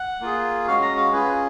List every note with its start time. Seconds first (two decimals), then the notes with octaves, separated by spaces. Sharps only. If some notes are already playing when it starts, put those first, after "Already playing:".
Already playing: F#5
0.21 A#3 F4 G#4
0.67 G#3 C#4 F#4 F5
0.82 A#5
0.97 F5
1.12 C#4 F4 G#4 B4